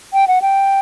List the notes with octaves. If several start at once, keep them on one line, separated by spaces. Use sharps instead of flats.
G5
F#5
G5